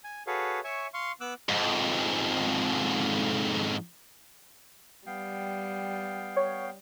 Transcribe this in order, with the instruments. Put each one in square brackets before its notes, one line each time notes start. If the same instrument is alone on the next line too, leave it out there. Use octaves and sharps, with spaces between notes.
[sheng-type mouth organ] G#5
F#4 G#4 A4 B4 C#5 F5
C#5 E5 G#5 C#6
F5 C6 C#6
B3 D6 E6 F#6
[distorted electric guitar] F2 G#2
[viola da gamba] G3 [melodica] B3 F5 G5
[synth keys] C#5